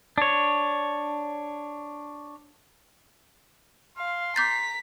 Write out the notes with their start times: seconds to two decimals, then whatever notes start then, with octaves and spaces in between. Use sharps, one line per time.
0.18 D4 C#5
3.98 F5 C6
4.36 A#5 D6 G6 A6 B6